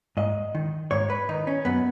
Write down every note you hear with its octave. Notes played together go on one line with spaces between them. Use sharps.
G#2 D#5
D#3
G#2 C#5
B4
D#3 D#4
C#4
F#2 B3